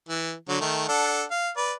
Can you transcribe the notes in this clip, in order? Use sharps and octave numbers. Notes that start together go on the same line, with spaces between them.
E3
D3 F#3
D#3 A3
D4 A4 F#5
F5
B4 D5